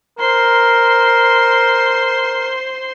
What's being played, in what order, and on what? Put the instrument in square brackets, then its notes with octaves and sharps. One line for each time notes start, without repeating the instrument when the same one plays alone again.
[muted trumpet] A#4 [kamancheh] C5 C6